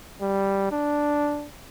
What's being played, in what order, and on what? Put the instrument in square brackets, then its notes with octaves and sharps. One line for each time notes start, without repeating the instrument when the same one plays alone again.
[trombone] G3
D4